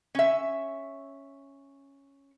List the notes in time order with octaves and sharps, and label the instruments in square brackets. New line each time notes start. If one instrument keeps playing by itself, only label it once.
[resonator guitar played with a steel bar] C#4 E5